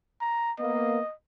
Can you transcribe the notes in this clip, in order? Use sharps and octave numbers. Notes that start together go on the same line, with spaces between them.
A#5
A#3 B3 D#5